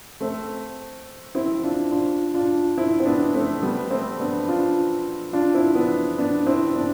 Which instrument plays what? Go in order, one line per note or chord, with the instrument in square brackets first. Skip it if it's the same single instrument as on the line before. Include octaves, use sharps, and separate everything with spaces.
[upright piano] A3 C4
C4 E4
D4 F4
D4 F4
D4 F4
C4 E4
C4
B3 D4
A3 C4
G3 B3
A3 C4
B3 D4
D4 F4
D4 F4
C4 E4
B3 D4
B3 D4
C4 E4
B3 D4